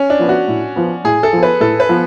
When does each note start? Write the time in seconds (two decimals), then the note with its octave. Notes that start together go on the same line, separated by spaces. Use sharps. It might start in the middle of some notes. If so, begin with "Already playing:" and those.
Already playing: C#4
0.10 D4
0.19 F3 B3
0.29 F#4
0.48 A2
0.76 F3 B3
1.04 A2 G#4
1.23 A4
1.33 F3 B3
1.43 B4
1.60 A2 A4
1.80 B4
1.89 F3 B3